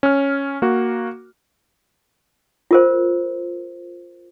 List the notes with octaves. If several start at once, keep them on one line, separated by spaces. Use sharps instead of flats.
C#4 F6
A#3 F#4
F4 A#4 C5